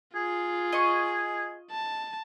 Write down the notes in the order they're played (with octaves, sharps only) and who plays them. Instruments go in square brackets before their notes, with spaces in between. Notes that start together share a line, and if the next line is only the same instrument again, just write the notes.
[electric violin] F4 [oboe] G#4
[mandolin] D#5 C#6
[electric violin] A5